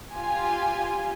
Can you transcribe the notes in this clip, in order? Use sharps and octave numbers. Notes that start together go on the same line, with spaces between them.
F4 G4 G#5